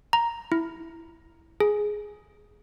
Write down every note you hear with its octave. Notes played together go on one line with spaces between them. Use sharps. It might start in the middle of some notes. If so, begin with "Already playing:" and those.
A#5
E4
G#4